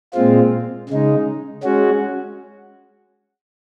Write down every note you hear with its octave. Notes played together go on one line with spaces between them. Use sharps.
A#2 G#3 C4 F4
C#3 G#3 D#4
G#3 C#4 F#4